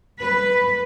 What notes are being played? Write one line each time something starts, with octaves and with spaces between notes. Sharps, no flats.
B4